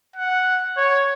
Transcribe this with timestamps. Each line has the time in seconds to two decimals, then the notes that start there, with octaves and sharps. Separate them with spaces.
0.16 F#5
0.77 C#5